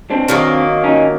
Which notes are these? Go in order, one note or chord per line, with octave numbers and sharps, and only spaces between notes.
C4 D4
D#3 F#3 A#3
C#4 D#4